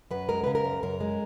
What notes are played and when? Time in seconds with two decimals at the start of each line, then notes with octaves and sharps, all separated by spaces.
0.11 F#2 B4
0.29 G#3 A#4
0.44 C#3 B4
0.55 A#4
0.64 F#2
0.83 F#2 A#4
1.00 G#3